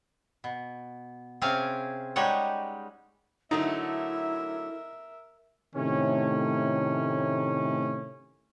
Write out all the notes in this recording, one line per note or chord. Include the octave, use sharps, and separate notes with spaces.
B2
C3 C4 C#4 G#4 F5
G3 G#3 D#4 G4 C#5 F#5
D3 F#3 A3 D#4 E4 A#4 E5
A2 C3 D#3 A3 C#4